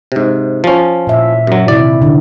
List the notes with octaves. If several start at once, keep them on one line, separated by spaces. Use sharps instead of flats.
G#2 C3
F3 C#4
A#2 E5
F#2 F#3
C3 D#3 E4 D5
D3